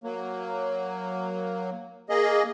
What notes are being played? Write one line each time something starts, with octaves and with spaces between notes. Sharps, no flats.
F#3 A#3
A#3 G#4 D#5